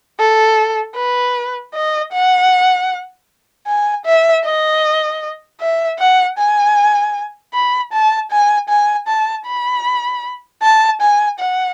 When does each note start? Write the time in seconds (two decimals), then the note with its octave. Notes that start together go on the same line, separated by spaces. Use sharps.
0.20 A4
0.97 B4
1.75 D#5
2.13 F#5
3.67 G#5
4.06 E5
4.45 D#5
5.60 E5
5.99 F#5
6.38 G#5
7.54 B5
7.92 A5
8.31 G#5
8.69 G#5
9.08 A5
9.47 B5
10.63 A5
11.01 G#5
11.40 F#5